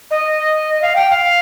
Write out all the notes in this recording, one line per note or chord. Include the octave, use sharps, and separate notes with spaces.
D#5
F5
G5
F5